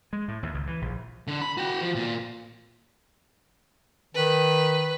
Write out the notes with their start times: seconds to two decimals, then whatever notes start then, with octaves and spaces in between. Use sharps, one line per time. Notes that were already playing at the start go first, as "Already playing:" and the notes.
0.13 G#3
0.28 A2
0.43 D#2
0.54 C#2
0.67 E3
0.82 A#1
1.28 D3
1.41 B5
1.58 F#4 G5
1.81 F3
1.95 A#2
4.15 D#3 B4